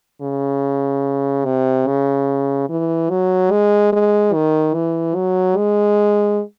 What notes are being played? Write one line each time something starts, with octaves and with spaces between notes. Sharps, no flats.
C#3
C3
C#3
E3
F#3
G#3
G#3
D#3
E3
F#3
G#3